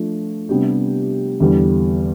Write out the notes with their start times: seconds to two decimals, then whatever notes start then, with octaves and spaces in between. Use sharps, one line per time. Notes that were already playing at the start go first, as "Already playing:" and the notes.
Already playing: F3 A3 D4 F4
0.49 C3 G3 B3 D4 G4
1.40 E2 D3 G3